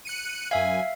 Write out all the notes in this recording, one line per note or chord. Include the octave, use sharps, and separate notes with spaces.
F#6 C#7 D#7
F#2 E5 F5 G#5